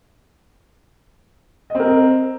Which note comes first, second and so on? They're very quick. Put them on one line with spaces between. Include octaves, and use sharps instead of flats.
D#5 C4 A#4